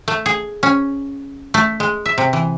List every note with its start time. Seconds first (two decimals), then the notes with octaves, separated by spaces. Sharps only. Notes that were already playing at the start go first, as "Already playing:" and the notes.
0.08 A3
0.26 G#4
0.63 C#4
1.54 A3
1.80 G#3
2.06 E5
2.18 C3
2.33 E3